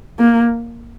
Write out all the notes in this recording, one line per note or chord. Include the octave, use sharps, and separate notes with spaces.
A#3